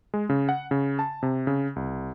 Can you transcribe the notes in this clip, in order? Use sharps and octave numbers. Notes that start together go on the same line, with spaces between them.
G#3
C#3
F#5
C#3
A5
C3
C#3
C2